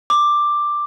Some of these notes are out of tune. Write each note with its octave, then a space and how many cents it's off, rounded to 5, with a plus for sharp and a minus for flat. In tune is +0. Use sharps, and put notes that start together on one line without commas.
D6 +5